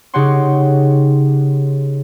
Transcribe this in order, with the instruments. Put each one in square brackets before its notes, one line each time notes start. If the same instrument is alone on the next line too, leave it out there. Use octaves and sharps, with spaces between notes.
[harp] C#3 D#4 G4 C#5 F#5 C6